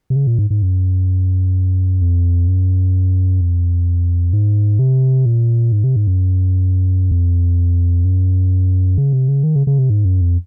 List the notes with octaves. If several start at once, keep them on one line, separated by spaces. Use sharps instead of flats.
C3
C#3
A#2
G#2
G#2
F#2
F2
F#2
F2
G#2
C3
A#2
G#2
C3
G#2
F#2
F2
F#2
C#3
C3
C#3
D#3
C#3
C#3
C3
G#2
F#2
F2